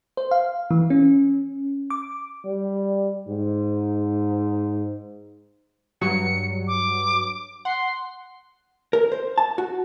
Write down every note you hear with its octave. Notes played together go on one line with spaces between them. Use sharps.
C5
F5
E3
C#4
D6
G3
G#2
G2 F#3 C#7
D6
F#5 C6
A#4
C5
A5
F#4